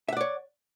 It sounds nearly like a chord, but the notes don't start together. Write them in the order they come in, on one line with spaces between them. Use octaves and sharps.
E5 F#5 D5 C#5